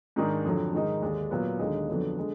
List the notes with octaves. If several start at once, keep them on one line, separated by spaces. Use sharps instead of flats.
G#2 D#3 G#3 D4
F2 D3 F#3
G#2 D#3 G#3 D#4
D#2 D3 G#3 D4
A#2 F#3 B3
D#2 D3 G#3 D#4
F2 D3 F#3 B3 D4
D3 G#3